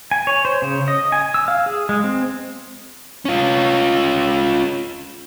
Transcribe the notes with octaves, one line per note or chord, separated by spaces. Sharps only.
G#5
C#5
C5
C#3
D#5
G#5
E6
F5
G#4
G#3
C4
C#4 F4